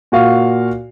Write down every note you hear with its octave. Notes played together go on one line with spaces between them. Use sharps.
A#2 F#4 F5